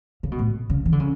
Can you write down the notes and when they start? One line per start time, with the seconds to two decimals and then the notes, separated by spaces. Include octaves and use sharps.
0.23 C#3
0.32 B2
0.39 A2
0.70 C#3
0.86 E3
0.92 D3
1.00 C#3